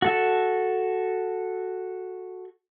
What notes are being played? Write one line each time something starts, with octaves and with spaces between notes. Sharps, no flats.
F#4 A4 E5